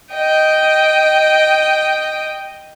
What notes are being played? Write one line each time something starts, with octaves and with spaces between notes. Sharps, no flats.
D#5 G5